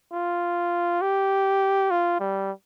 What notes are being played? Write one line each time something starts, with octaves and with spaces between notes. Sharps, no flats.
F4
G4
F4
G3